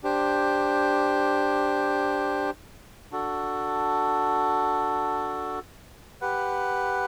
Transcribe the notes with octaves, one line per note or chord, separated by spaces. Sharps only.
D4 G4 C5
D4 F#4 A4
G4 B4 F#5